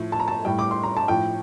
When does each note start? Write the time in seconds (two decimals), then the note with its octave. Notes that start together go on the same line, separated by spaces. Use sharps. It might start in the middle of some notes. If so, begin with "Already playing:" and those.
Already playing: A2 F3
0.12 A5
0.20 A#5
0.28 A5
0.44 A2 G3 G5
0.59 D6
0.71 C6
0.84 A#5
0.97 A5
1.08 A2 F3 G5